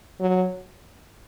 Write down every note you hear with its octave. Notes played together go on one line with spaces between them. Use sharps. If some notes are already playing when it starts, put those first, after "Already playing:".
F#3